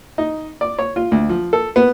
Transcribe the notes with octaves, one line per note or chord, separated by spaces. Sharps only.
D#4
D5
C#5
F4
D2
F3
A4
B3